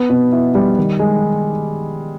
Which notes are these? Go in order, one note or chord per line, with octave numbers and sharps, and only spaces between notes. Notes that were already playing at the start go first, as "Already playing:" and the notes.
Already playing: B3
B2
E4
G3
D#3
G#3